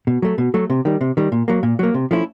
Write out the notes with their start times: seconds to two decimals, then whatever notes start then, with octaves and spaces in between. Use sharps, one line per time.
0.07 B2
0.22 F#3 A3
0.38 B2
0.54 F#3 A3
0.70 C3
0.85 D#3 G3
1.01 C3
1.17 D#3 G3
1.32 A#2
1.48 F#3 A#3
1.63 A#2
1.79 F#3 A#3
1.94 C3
2.11 F3 A3 C#4 E4